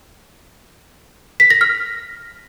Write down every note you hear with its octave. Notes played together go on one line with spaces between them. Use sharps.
B6
A#6
F6